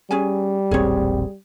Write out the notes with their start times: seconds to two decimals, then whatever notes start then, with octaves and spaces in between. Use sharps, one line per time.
0.11 G3 C#4 G#4 G#5
0.71 E1 A#1 C4 G#4 C#5